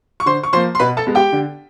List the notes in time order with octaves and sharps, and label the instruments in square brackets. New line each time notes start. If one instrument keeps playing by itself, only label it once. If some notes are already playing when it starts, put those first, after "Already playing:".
[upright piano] C#6
D3 C5 C6
C#6
F3 A#3 C5 C6
C6
B2 B4 B5
A4 A5
G#3 B3
G4 G5
D3